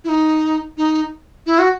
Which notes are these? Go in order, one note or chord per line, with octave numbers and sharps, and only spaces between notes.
E4
D#4
D#4
E4
F#4